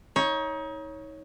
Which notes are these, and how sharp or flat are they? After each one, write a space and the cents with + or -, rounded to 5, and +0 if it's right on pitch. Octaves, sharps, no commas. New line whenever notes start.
D#4 +30 C#5 +0